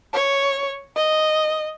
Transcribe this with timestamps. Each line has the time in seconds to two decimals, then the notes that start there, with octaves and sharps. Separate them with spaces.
0.13 C#5
0.96 D#5